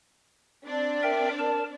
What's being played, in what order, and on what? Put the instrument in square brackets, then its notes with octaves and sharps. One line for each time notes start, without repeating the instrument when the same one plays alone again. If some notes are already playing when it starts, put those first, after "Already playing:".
[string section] C4 D4 D5
[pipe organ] A#4 E5 G5
A#4 A5